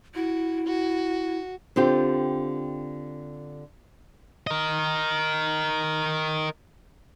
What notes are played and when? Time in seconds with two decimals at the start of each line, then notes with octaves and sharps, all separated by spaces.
0.15 E4 F#4
0.66 F#4
1.76 D3 C4 F4 G4
4.47 A#4 D#5